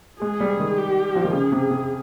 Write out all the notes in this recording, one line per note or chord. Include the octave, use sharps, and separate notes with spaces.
G#3 G#4
G3
D#3
G4
F3
D#3
C#3 G#4
C3
C3